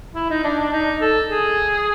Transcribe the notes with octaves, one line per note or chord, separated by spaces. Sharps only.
E4
D#4
D4
D4
D#4
A4
G#4